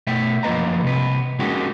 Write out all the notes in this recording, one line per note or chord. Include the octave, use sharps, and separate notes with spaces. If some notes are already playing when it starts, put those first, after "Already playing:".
B2 A3 E5 G5
F#2 F3 A#3 B4 D#5 A#5
C2 C3 B4
G#3 A#3 C#4 D#4 F#4 G4